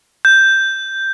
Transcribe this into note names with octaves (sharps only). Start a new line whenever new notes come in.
G6